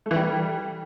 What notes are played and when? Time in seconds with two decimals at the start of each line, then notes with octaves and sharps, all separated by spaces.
0.06 A3
0.11 E3
0.16 G3